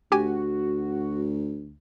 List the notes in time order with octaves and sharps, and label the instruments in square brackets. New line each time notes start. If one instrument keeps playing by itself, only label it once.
[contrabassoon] D2 [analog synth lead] F#4 [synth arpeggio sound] G4 G#5